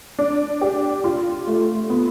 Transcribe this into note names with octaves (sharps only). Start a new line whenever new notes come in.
D4
G4
F4
A3
B3